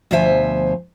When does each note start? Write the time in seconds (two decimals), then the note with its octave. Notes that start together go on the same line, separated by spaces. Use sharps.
0.11 D2 B2 F3 C5 E5 G#5